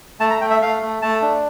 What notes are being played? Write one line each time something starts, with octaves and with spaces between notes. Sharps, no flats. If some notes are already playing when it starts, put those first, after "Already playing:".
A3 A5
A#5
A3 G5
E5
A3 F5
A3
A3 A5
D4